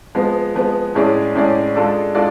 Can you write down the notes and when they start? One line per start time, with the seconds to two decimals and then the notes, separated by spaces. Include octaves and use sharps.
0.15 F3 G#3 B3
0.55 F3 G#3 B3
0.95 A2 G#3 C#4 G#4 D5
1.35 A2 G#3 C#4 G#4 D5
1.75 G#3 D4 F4 A4 D5
2.15 G#3 D4 F4 A4 D5